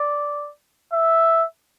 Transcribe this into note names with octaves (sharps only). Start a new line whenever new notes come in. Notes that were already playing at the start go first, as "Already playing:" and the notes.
Already playing: D5
E5